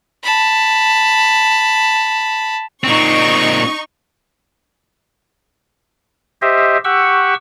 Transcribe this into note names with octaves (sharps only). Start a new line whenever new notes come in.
A5 B5
A#2 C4 D#4 C#6
G4 C5 D#5 E5
G4 F#5 C#6 E6